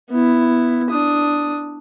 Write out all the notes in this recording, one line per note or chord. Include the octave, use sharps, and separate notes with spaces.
B3 E4
D4 D#6